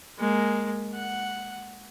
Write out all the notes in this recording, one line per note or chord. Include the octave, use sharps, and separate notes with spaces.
G#3 A#3
F#5